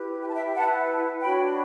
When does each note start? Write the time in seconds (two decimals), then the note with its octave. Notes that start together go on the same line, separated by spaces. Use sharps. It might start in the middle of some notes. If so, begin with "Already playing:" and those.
Already playing: E4 G4 B4
0.22 G5
0.28 A5
0.35 E5 G5
0.48 G5
0.55 E4 B4 F#5 A5
1.22 D4 F#4 C#5 G5 B5